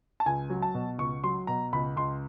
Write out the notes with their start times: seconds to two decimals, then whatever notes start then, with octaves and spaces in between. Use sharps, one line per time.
0.20 A5
0.26 C#2 G#5
0.50 F#3
0.62 A5
0.74 B2
0.98 C#2 C#6
1.24 F#3 C6
1.47 B2 A#5
1.73 C#2 B5
1.96 C#2 C6